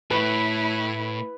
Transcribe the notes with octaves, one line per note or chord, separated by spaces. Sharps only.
A2 E4 B4